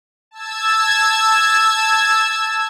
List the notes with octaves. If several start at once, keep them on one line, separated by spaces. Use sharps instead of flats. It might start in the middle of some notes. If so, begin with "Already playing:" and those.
A5 E6 G#6